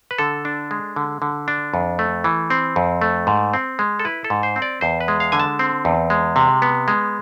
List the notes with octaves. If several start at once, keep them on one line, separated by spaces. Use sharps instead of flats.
B4
D3 A4
D4
G#3
D3
D3
D4
F2
A3
E3
C4
F2
A3
G#2
C4
G#3
A4
E4 B4
A4
G#2
C5
C4
D5
E2 C5
B4
G#3
F5
D3 G#5
A5
C4
E2
G#3
C3
B3
G#3